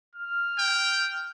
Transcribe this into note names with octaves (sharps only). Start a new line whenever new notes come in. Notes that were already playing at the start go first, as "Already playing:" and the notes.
F6
G5